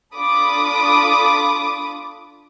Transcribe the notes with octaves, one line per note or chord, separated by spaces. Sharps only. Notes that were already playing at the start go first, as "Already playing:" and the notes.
D4 F4 A4 B5 D6 D#6